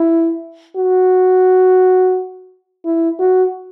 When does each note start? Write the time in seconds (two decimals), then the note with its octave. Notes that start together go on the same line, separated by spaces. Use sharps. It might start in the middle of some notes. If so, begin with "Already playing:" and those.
Already playing: E4
0.77 F#4
2.85 E4
3.20 F#4